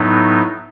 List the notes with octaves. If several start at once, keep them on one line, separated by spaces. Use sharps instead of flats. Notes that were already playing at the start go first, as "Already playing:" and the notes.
Already playing: A2 F#3 B3 D#4